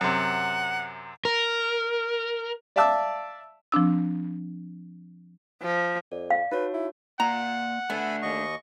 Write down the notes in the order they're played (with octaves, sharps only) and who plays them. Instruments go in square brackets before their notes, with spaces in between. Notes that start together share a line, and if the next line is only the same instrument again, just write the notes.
[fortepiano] F#2 C3 [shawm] F#5
[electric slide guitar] A#4
[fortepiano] D5 E5 F5 A5 D6 E6
[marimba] F3 C4 D4 E6
[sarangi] F3
[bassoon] F2 [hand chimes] D5
[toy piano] F5
[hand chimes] D#4 F#4 C#5 [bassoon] B4
[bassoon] E4
[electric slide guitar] A#3 D5 [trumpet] F#5 [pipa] A#5
[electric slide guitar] A3 D4 A4 [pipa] B3 [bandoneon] E5 G#5 B5
[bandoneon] D#2 D#5 C#6